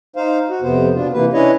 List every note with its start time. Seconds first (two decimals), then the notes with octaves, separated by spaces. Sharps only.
0.16 D#4 C5 F5
0.50 F#4
0.62 F2 C3 B3 C5
0.95 B2 B3 D4 F4
1.13 C3 E3 A#3 B4
1.33 C#4 D4 E4 B4 C#5 D#5